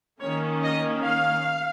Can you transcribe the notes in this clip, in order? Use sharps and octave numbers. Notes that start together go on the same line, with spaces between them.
D#3 A#3 C#4 C#5
D#5
F5